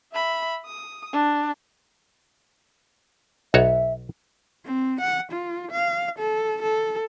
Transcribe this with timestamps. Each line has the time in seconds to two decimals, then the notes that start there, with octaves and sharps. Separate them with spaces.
0.12 E5 B5
0.66 D#6
1.13 D4
3.54 B1 F#4 C#5 E5
4.65 C4
5.01 F#5
5.32 F4
5.71 F5
6.18 A4
6.62 A4